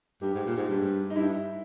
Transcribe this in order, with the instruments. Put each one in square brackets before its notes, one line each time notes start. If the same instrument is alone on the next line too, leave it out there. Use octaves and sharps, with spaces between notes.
[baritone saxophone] G2 [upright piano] G4
[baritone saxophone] G#2
A#2
G#2
G2
[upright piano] D#4
[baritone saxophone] G2 [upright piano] E4